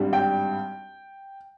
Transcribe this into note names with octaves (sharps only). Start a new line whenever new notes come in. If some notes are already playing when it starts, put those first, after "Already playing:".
Already playing: G#1 G2 G3
G5